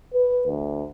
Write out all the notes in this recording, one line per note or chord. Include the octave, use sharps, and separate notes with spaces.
B4
D2